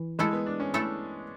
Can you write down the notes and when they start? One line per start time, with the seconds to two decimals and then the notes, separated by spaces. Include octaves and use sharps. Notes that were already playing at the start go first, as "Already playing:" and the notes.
Already playing: E3
0.19 G#3 A3 E4 A4
0.33 B3
0.46 D4
0.60 C#4
0.74 A3 E4 A4